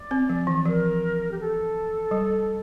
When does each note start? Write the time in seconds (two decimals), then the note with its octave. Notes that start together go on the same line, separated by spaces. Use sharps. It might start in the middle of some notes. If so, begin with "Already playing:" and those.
Already playing: D5
0.11 C4
0.29 F3
0.47 E3
0.65 F3 A#4
1.31 G4
1.39 A4
2.11 G3